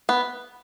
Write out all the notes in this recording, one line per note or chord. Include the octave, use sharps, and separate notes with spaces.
B3